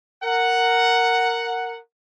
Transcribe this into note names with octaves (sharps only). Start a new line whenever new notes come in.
A#4 F#5